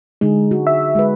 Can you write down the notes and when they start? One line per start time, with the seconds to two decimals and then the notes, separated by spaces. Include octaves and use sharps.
0.21 D3 G#3 D#4 G#4
0.51 F#4
0.67 E5
0.95 G#3 G#4 B4